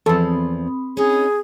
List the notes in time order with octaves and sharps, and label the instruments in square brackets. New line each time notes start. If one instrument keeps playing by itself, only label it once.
[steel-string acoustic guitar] E2 F3 [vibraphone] C4 B5 D#6 [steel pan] A4
[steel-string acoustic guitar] C#4 D#4 [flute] G#4